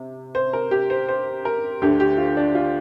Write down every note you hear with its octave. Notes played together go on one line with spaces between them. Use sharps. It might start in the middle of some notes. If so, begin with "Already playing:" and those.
Already playing: C3
C5
A#4
G4
C5
C5
A#4
D2 D3 G4
G4
F4
D4
F4